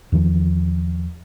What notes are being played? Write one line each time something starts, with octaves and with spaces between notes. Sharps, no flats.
E2 D#3 F3